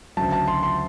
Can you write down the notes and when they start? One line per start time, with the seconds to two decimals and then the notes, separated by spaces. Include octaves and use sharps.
0.17 D2 C#3 F#3 A5
0.32 A5
0.48 C6
0.63 C6